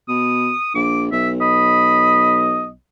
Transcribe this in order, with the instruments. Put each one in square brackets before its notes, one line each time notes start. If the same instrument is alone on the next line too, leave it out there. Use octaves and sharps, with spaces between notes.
[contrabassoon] B2 [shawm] D#6
[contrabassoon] A#1 [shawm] D6
[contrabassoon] B1 [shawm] E5
[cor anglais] D#5 [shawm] B5